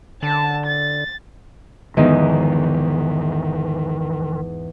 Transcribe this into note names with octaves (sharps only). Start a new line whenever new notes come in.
D3 A5
A6
E2 G#2 D3 D#3 F3 D#4